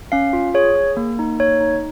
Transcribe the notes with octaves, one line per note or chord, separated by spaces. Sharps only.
C#4 F5
F4
G#4 C#5
G#4
A#3
D#4
A#3 C#5
D#4